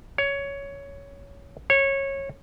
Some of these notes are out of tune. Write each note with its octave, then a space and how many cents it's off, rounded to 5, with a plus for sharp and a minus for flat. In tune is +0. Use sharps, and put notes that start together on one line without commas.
C#5 +15
C#5 -15